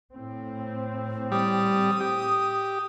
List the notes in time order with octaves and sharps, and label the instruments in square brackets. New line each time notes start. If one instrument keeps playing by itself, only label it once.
[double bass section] A2 C4
[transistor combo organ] G3 [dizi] D#6
[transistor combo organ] G4